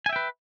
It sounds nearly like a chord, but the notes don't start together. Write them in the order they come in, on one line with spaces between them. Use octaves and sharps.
G#5 E5 G5 B4